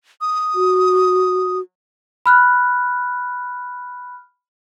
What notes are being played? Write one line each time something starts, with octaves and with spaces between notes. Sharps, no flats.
D#6
F#4
B5 F6 F#6